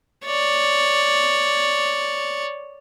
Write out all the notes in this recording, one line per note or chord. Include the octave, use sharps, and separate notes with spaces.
C#5 D5